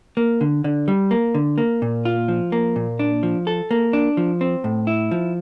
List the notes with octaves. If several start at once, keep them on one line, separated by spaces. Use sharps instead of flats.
A#3
D3
D3
G3
A#3
D3
A#3
A#2
F4
F3
A#3
A#2
D4
F3
A4
A#3
D4
F3
C4
A2
E4
F3